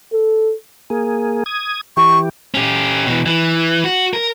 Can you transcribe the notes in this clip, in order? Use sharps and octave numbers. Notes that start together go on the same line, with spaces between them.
A4
A#3 G#4
D#6 G#6
E3 G4 C#6
C#4 G4
B2 E3
E3
F#4
A#4